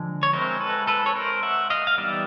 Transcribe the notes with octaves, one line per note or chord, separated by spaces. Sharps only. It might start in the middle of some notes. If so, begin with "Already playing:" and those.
Already playing: D3 F3 G#3
C#5
G#3 C4 E4 A#4 C5
A4 B4
A4 B4
C#5
A#4 C5
E5 F#5
D#5 F5
F5
E3 G3 B3 D#4 D5 E5